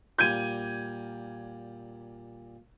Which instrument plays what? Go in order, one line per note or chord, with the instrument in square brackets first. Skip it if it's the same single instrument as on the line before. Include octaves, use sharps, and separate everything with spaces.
[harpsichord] A#2 G3 [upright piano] G6 G#6 D#7